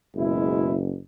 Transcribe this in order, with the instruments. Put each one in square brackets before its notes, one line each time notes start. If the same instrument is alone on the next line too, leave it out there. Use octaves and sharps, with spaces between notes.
[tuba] F#1 [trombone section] B2 G#3 E4